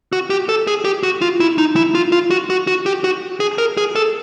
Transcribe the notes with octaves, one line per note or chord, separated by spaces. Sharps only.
F#4
G4
A4
G#4
G4
F#4
F4
E4
D#4
E4
F4
F4
F#4
F#4
F#4
G4
F#4
G#4
A#4
G#4
A4